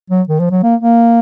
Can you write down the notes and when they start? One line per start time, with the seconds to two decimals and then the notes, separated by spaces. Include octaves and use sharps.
0.10 F#3
0.29 D#3
0.40 F3
0.51 F#3
0.63 A#3
0.81 A#3